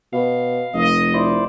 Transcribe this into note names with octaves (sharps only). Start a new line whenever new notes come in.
B2 F5
F1 D#5
E4 C5 D5